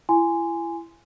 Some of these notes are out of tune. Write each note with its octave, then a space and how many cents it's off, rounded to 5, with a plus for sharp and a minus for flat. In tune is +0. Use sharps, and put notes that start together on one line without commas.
E4 +35 G#5 -5 C6 -15